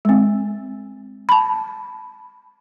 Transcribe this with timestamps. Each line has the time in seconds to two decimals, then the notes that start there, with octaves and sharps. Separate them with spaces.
0.05 G#3 C4
1.29 A5 B5